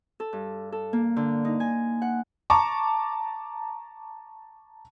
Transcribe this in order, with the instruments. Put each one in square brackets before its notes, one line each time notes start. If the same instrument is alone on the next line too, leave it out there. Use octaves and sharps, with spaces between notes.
[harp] A4
G2
A4
A#3
D3
D#4
G#5
F#5
[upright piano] A5 A#5 C#6 D6